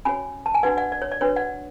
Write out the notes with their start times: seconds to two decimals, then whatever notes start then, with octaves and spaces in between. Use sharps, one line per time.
0.05 C#4 F#4 C#5 G#5 B5
0.46 A5
0.54 G#5
0.63 D4 F#4 B4 D5 F#5
0.77 D5 F#5
0.92 D5
1.02 C#5
1.12 D5
1.21 D4 F#4 B4 C#5
1.36 D5 F#5